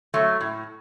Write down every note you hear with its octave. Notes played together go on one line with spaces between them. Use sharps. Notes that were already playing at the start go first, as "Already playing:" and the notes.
F#3 A3
A2